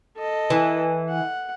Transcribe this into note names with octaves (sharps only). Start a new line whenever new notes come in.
A4 D#5
E3
F#5